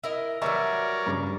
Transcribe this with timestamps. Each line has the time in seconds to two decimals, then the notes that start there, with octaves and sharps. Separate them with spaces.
0.04 E4 A#4 D#5
0.42 E3 F#3 G3 A#4 C#5 D5 E5 C#6
1.06 G2 C#3